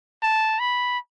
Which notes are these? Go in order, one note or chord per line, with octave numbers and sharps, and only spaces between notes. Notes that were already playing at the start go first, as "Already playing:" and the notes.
A5
B5